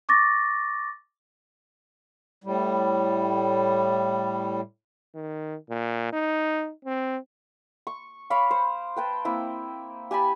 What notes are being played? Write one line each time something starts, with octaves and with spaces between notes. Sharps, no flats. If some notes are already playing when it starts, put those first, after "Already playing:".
C#6 D6 A6 A#6
A2 G3
D#3
A#2
D#4
C4
C#6
C#5 F5 B5 D6
C5
B4 G5 A5
A#3 C4 E4
G4 G#5 A5 B5